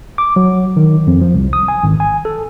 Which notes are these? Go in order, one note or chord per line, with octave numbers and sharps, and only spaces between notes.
D6
F#3
D#3
F2
F3
C2
D#6
G#5
G#1
G#5
A4